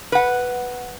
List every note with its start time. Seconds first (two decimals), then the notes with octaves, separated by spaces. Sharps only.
0.12 B4 F#5